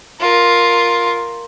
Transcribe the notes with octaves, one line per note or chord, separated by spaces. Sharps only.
F4 A#4